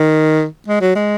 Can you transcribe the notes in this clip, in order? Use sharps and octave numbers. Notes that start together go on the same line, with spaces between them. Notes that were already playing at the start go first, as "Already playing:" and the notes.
Already playing: D#3
G#3
F#3
G#3